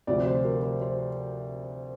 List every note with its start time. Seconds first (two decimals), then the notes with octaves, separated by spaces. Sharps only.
0.07 D2 C3 F3 D5
0.26 C5
0.45 A#4
0.63 C5
0.81 C5